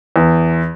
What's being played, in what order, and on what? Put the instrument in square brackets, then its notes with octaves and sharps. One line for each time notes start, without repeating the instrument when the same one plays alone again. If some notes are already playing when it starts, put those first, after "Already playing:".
[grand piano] E2